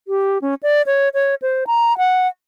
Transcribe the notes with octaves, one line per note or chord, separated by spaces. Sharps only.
G4
C#4
D5
C#5
C#5
C5
A#5
F#5